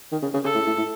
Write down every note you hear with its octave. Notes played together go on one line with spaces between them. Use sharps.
D#3
C#3
C#3
C#3 A4
A2
A2
A2